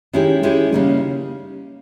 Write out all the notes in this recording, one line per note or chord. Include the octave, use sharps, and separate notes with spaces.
D#3 G#3 C#4 E4 G4
D#3 G#3 C#4 E4 G4
C#3 G3 A#3 D#4